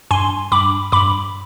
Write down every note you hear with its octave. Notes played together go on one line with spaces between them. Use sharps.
G2 G#5 C6
G2 B5 D6
G2 B5 D6